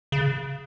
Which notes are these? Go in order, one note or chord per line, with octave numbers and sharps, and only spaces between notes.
C#3